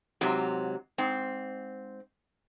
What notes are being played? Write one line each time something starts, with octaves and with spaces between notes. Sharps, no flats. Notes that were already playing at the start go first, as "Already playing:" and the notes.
G#2 C3 F#3
G#2 C4